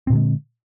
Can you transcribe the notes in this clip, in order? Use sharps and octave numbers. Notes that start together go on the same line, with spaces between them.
A#2 D3 G#3 C4